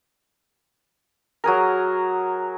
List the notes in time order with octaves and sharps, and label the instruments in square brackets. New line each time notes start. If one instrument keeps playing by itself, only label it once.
[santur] F#3 G#4 A#4